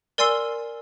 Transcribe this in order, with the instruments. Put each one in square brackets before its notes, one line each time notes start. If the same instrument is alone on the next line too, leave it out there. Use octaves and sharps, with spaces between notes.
[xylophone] A#4 D5 G#5 C6 E6 C7